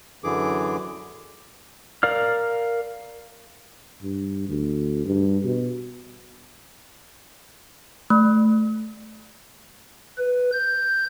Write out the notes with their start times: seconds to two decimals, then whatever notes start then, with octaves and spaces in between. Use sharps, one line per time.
0.24 F#2 D3 E3 G#4 D6
2.03 A#4 D5 F5 F6
4.03 G2
4.49 D2
5.05 G2
5.44 B2
8.10 A3
10.18 B4
10.53 G6